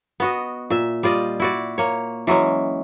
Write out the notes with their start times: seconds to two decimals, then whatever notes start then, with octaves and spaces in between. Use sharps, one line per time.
0.20 B3 F#4 D#5
0.70 A#2 E5
1.03 G3 F4 D5 D#5
1.40 E4 F#4 D5
1.78 A#3 C#5
2.27 E3 F#3 G#3 C#4